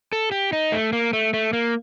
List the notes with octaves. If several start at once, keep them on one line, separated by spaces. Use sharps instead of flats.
A4
G4
D#4
A3
A#3
A3
A3
A#3